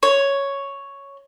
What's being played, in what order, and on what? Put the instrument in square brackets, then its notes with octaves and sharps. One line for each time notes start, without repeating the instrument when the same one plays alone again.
[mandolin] C#5